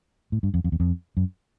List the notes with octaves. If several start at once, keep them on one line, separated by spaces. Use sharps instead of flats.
A2
G2
F2
F2
E2
F2
F#2